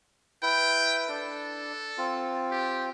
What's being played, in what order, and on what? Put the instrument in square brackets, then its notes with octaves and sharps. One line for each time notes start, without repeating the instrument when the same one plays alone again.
[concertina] E4 B4 [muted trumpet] G5
[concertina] D4 [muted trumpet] A4
[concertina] C4 F4
[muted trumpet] G4